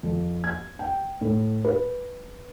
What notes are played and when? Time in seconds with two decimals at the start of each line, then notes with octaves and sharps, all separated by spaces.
0.03 F2
0.44 G#6
0.79 G5
1.21 A2
1.65 B4